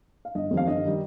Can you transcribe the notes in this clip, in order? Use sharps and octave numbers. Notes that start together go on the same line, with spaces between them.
F5
G1 D#5
F2 D#3 G3
F5
G1 D#5
D#3 G3